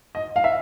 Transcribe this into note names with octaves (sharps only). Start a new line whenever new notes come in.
D#5
F5
E5